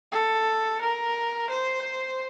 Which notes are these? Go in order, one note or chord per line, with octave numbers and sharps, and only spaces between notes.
A4
A#4
C5